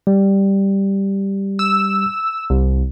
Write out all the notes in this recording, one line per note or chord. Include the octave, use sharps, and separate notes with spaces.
G3
E6
C2